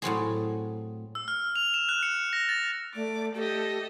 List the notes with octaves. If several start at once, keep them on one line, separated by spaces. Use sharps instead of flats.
A2 F#3 C4 G#4
E6
F6
F7
E7
F#6
C#7
A#6
A6
A3 D5 D6
A3 G4 A4 D#5